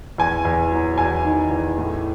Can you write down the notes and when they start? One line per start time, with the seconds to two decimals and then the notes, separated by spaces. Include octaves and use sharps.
0.18 E2 G#5
0.45 E2
0.72 F#3
0.98 E2 G#5
1.25 D#3
1.51 E2
1.78 A2